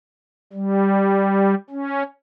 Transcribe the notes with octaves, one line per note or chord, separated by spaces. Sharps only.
G3
C#4